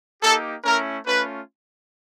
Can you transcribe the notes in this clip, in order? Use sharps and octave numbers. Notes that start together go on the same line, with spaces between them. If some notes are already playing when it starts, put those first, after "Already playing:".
A#3 D#4 G4 A4
A3 C#4 E4 A#4
A3 C#4 F4 B4